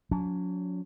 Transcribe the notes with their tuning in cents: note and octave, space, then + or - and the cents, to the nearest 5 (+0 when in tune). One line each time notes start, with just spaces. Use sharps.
F#3 -35 C#4 +45